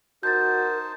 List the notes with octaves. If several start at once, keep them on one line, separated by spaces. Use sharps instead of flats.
D#4 F#4 A#4 C5 A5 G6 A6